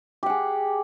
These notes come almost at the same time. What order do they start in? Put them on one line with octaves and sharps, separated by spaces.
G4 F#5 G#4